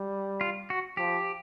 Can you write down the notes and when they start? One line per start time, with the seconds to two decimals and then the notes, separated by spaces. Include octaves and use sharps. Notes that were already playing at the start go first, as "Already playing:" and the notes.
Already playing: G3
0.41 F4
0.70 F#4
0.97 F3 G4